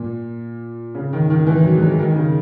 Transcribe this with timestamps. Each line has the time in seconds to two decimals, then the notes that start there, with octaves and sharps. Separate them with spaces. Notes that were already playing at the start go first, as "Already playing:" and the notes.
Already playing: A#2
0.95 C#3
1.13 D#3
1.30 D#3
1.47 E3
1.64 F#3
1.76 G#3
1.82 F#3
1.99 D#3
2.16 C#3